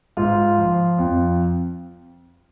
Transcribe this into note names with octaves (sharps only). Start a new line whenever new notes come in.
G#2 F4
F3
F2